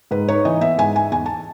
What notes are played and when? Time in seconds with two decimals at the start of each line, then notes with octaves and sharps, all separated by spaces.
0.11 G#2 B4
0.28 D#4 C#5
0.45 E3 D#5
0.61 B3 E5
0.78 G#2 G#5
0.96 D#4 G#5
1.11 E2 G#5
1.26 A5